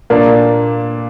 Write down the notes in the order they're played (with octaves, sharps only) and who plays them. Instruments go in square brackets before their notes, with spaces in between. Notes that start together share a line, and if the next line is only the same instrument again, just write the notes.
[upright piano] A#2 A#3 D4